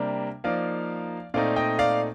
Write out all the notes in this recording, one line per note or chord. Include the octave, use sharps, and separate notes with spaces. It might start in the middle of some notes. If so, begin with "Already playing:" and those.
Already playing: C3 G3 A#3 D4
F3 A#3 D#4 D5 F5
A#2 A3 C4 D#4 D5 F5
D#5 G5
D5 F5